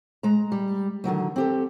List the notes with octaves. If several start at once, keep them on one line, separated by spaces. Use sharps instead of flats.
G#3 A#5
G3
D3 D#3 F#3 A3
C4 G4 A4